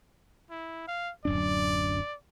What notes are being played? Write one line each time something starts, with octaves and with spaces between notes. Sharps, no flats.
E4
F5
D1 F#2 D4 D5